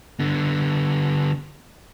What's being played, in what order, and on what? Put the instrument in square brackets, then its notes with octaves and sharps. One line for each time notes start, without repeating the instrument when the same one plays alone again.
[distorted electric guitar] D3 B3